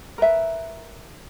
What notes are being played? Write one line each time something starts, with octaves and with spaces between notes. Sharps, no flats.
A#4 B4 E5